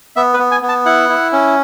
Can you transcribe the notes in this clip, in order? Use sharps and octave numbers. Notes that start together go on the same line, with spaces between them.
B3 E5
B4
B3
G#5
B3
A5
E4 F#5
E4
C#4